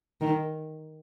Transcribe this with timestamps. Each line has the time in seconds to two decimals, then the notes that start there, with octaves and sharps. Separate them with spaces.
0.21 D#3